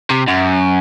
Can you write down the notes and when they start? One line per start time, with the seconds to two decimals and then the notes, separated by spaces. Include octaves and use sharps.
0.10 C3
0.28 F#2